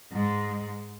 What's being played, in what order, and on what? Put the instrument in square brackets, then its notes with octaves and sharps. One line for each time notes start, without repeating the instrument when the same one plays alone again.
[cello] G#2 G#3